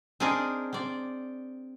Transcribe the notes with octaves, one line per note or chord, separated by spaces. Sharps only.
C4 D4 D#4 G#4 A#4 D5
C4 D5